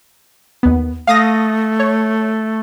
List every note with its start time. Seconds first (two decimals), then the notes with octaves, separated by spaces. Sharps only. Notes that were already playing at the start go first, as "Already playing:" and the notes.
0.63 D#2 B3
1.07 A3 F5 D#6 A#6
1.79 C#5